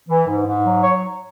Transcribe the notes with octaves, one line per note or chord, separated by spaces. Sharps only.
E3
G#2
G#2
F#3
C#5